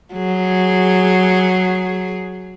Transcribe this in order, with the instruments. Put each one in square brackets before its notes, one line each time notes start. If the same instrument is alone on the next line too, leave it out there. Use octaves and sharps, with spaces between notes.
[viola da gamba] F#3 G#4